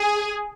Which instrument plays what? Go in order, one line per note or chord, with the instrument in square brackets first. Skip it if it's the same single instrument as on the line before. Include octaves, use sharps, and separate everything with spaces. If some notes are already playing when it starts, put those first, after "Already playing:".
Already playing: [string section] G#4